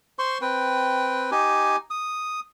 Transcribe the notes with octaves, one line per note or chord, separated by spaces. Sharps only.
C5 C6 C#6
C4 B4 G5
D#4 G4 G#5
D#6